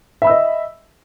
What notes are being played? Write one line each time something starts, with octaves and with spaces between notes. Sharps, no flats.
D#5 E5 B5 E6